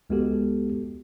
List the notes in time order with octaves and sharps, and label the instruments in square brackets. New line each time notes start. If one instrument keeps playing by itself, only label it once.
[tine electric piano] C#2 G#3 B3 F#4 G4 A4